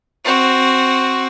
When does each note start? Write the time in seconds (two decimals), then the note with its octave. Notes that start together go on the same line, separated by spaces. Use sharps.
0.25 C4 F#4